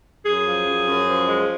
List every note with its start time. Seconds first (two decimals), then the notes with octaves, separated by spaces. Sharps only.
0.25 F#2 G#4
0.46 F3
0.66 F#2
0.87 F#2
1.08 F3
1.28 G#3